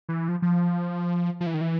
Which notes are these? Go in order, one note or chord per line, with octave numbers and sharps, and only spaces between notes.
E3
F3
F3
F3
E3
D#3
E3